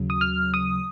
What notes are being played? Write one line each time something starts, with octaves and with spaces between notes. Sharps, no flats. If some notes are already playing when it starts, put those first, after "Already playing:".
Already playing: D#2 C#3 F#3
D#6
F6
D#6